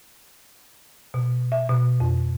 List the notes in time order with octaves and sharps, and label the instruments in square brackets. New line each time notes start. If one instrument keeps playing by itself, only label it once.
[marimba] B2
E5
B2
F2